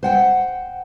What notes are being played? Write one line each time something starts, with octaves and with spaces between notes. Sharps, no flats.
C5 F#5 G5